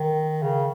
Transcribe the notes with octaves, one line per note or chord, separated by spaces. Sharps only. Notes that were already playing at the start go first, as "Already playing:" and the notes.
Already playing: D#3
C#3